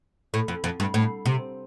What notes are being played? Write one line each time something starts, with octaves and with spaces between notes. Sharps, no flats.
A2
F2
F2
G2
A2
C3